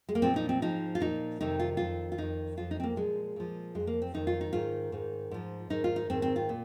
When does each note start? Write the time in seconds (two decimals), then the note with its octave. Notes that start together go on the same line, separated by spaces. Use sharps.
0.09 G#3
0.15 A#3
0.22 A#2 F3 C4
0.36 D#4
0.49 C4
0.62 G#2 F3 D#4
0.95 F4
1.00 A#2 F3 D#4
1.41 F2 C3 D#3 D#4
1.60 F4
1.77 F2 D#3 F4
2.12 F4
2.18 F2 D#3 D#4
2.57 F2 F3 F4
2.71 D#4
2.80 C4
2.83 A#3
2.96 A#2 F3 G#3
3.36 A#2 F3
3.75 F2 F3 G#3
3.87 A#3
4.02 C4
4.14 F2 D#3 D#4
4.27 F4
4.41 D#4
4.53 G#2 D#3 F4
4.92 G#2 D#3
5.31 G#2 F3
5.70 G#2 D#3 D#4
5.84 F4
5.96 D#4
6.10 G#2 D#3 C4
6.22 C4
6.36 F4
6.49 A#2